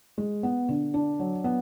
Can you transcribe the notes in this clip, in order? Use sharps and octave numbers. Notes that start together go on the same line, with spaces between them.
G#3
B3
D3
D4
F#3
B3